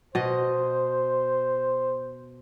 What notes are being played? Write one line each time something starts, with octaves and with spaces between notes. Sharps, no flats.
B2 C5 D#5